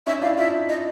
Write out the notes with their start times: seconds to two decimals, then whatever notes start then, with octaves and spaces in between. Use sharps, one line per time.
0.07 C#4 D#4 E5
0.21 D4 E4 F5
0.37 D#4 F4 E5
0.69 D#5